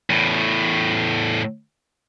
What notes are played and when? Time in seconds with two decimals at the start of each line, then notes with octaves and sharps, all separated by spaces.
0.10 E2 A2